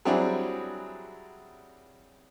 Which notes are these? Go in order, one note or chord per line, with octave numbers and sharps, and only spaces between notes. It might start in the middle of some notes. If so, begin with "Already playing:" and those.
F#3 G3 C4 D4 E4 G#4